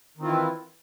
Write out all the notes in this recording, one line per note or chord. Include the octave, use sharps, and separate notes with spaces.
D#3 E3 C4 E4 F4